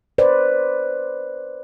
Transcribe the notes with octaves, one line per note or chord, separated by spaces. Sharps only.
B4 C5 D5